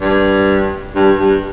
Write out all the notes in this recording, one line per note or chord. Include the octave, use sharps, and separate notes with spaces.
G2
G2
G2